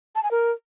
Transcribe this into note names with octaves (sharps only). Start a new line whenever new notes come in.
A5
G#5
A#4